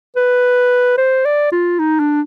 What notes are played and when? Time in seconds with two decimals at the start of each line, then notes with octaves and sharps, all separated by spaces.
0.16 B4
0.98 C5
1.25 D5
1.52 F4
1.79 D#4
1.99 D4